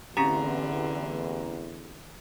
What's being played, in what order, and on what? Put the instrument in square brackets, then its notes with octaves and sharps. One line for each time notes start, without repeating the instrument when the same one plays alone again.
[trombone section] A1 E2 [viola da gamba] D3 [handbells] C4 C#4 G4 [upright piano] A#5